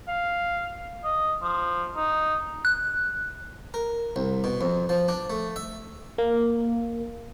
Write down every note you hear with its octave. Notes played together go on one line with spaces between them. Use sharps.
F5
D#5
F3
D#4
F#6
A#4
C2
B2
F2
F3
D4
A3
E5
A#3